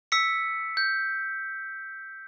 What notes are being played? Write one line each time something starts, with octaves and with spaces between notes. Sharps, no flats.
E6 B6 C#7
G6